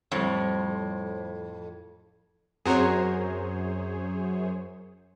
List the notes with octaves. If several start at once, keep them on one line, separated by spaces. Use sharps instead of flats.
F2 A2 G3 C5 C#5
F#2 C4 F#4 G#4 A#4 C5 C#5